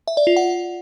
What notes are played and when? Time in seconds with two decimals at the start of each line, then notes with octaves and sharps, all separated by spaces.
0.08 E5
0.17 D5
0.27 F4
0.36 F#5